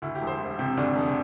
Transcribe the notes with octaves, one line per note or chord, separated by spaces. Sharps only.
D2 E4
G4
E1
C5
E1
C3 G4
D2 D4
E1